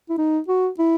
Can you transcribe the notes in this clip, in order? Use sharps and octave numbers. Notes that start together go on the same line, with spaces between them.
E4
D#4
F#4
E4